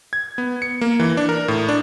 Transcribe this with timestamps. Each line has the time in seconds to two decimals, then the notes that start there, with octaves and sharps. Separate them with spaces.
0.13 G#6
0.38 B3
0.62 C#7
0.81 A#3
1.00 E3
1.17 D4
1.29 A#4
1.48 A2
1.69 D4